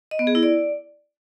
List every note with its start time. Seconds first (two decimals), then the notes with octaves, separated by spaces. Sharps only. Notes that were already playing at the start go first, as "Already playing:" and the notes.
0.11 D#5
0.19 B3
0.27 G#4
0.35 E4
0.43 D5